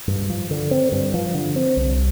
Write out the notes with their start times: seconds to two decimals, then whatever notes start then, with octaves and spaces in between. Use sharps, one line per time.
0.07 G2
0.30 F3
0.51 D3
0.71 C4
0.92 G2
1.14 F3
1.34 D3
1.56 C4
1.77 C2